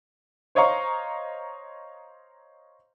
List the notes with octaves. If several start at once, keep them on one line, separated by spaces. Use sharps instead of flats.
C5 C#5 D#5 F5 A#5 C#6